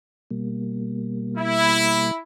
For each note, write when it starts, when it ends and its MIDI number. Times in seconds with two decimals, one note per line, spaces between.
0.31 2.11 47
0.31 2.11 55
0.31 2.11 58
1.37 2.21 64